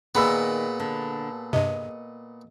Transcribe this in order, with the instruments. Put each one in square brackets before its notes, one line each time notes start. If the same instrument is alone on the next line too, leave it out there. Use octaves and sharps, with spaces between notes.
[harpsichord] A#2 B3 [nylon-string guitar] D#3 [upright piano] G#4 B5 E6
[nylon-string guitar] D3
[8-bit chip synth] G2 C3 [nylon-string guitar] D#5